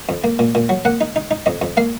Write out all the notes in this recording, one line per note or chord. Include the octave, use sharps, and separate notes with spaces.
F2
A#3
A#2
A#2
F#3
A#3 F#5
D#4
D#4
D#4
F2 D#5
F2
A#3 F5